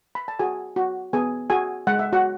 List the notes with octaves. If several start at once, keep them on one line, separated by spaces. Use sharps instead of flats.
B5
A5
F#4 G#4 G#5
F#4
B3 G#4 G#5
F#4 G#4 G#5
G#3 F#5
E5
F#4 F#5